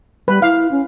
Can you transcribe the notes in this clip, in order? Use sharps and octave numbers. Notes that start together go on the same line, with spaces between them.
G3 B4
E4 F5
C#4